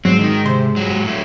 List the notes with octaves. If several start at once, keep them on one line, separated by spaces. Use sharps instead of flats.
G#2 F#3 C4
D#3 D#4
C3 C5
F#3 G#3
A2 F#3